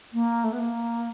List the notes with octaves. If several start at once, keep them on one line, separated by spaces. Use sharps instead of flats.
A#3
A3
B3
A#3